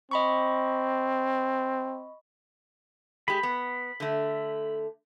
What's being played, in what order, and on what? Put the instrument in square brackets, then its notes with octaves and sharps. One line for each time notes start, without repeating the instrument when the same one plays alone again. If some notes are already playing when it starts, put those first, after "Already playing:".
[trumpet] C4 [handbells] D#5 B5 C#6
[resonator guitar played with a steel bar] G#3 G4 [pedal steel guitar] B5
[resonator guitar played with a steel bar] B3
D3 A3